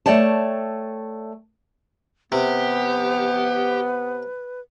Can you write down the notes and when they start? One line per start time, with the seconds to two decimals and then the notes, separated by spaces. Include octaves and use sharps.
0.06 A3 C#5 D5 G5 A5
2.32 C3 B3 G4 B4